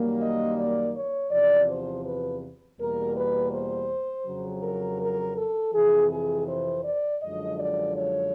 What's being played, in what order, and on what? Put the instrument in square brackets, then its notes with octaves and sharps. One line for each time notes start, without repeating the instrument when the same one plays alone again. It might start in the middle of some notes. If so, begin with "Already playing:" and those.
Already playing: [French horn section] F#2 D#3 G3 A#3
D#5
D5
C#5
E2 C3 F3 D5
C5
B4
E2 B2 G3 A#3 A#4
B4
C5
F2 C#3 F#3
A#4
A#4
A4
F2 C3 E3 G#4
G#4
C5
D5
F#2 D3 F3 G#3 D#5
D5
C#5